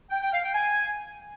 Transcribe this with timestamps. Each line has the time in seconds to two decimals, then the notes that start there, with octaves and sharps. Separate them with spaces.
0.10 G5
0.21 G5
0.32 F5
0.43 G5
0.54 G#5